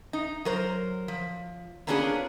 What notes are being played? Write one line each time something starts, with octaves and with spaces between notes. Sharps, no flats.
D#4
F#3 A#4 C5
F3
A#3 B3 C#4 D4 F4 G#4